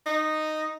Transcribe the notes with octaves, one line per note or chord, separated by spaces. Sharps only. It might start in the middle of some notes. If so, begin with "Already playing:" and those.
D#4